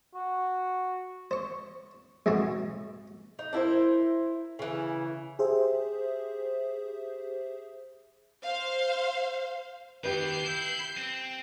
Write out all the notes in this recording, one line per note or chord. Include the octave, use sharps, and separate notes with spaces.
F#4
C5 C#6
B1 E2 G#2 B2 F#4
D#4
D4 E4 A#4 C5
C#3 E3
G4 G#4 C5 E5
C5 F5
D#2 G4 B4 G6 C7
E4
C4